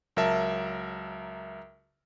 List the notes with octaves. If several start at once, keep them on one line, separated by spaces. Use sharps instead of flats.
C#2 F#3 A#4 E5 A5